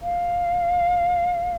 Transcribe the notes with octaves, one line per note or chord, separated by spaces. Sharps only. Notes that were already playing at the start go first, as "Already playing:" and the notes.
F5